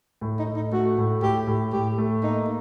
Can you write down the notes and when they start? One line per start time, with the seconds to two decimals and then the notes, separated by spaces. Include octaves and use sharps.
0.21 A2
0.39 D#4
0.47 A2
0.56 D#4
0.72 A3 F#4
0.98 A2
1.22 A2 G4
1.47 A2
1.73 A2 G4
1.98 A3
2.23 A#3 D#4